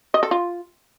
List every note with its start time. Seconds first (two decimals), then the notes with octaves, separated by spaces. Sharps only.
0.14 D#5
0.23 A4
0.31 F4